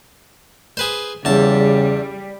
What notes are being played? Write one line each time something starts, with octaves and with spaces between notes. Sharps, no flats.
G#4 B4 C5
E2 C#3 G3 A5